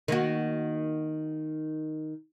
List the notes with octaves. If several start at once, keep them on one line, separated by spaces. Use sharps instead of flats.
D#3 A#3 F#4